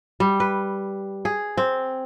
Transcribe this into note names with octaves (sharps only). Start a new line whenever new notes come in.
G3
B4
G#4
C4